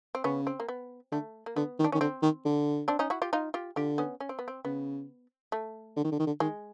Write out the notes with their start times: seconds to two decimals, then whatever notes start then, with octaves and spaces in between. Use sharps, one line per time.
0.15 C4
0.24 C#3 B3 C#4
0.47 C4
0.60 A#3
0.69 B3
1.12 D3 A3
1.46 A#3
1.56 D3 B3
1.79 D#3
1.84 D4
1.92 D#3 C#4
2.01 D3 C4
2.22 D#3
2.45 D3
2.88 C4 D4
2.99 C#4 D#4
3.10 E4 F#4
3.22 F4 G4
3.33 D#4 F4
3.54 F4 G4
3.76 D3 F4 G4
3.98 B3 C#4
4.20 C#4
4.29 C4
4.39 B3
4.48 C4
4.65 C#3 B3
5.52 A3
5.96 D3
6.04 D#3
6.11 D3
6.19 D#3
6.27 D3
6.40 D#3 G#3